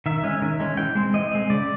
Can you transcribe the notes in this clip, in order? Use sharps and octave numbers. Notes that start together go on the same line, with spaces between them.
D#3 E5
G#3 C#4
D#3
G#3 C#4
E3 G5
G#3 C4
E3 D#5
G#3 C4
C#3 D5